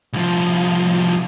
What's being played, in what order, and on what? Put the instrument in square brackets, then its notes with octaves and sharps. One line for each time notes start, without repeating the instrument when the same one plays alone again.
[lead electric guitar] C2 F3